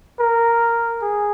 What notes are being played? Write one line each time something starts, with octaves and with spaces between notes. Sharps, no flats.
A#4
G#4